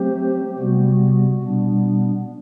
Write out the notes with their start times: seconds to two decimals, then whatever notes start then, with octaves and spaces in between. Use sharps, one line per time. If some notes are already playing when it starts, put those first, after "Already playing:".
Already playing: F#3 A3 C4 G4 C5
0.58 C3 G3 B3 F#4
1.43 B2 G3 B3 D4